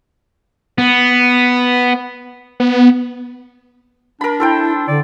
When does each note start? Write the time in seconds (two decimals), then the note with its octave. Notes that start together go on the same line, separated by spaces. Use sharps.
0.78 B3
2.60 B3
4.21 D4 A#4 B5
4.40 E4 A4 C5 G5
4.88 D3 D5